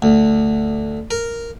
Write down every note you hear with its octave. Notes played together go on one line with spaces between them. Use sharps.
D2
A#4